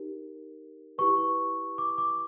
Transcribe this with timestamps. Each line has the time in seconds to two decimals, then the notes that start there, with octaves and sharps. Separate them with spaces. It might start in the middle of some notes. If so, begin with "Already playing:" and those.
Already playing: D#4 G4 A#4
0.98 E4 G4 B4 C#6
1.78 D6
1.98 D6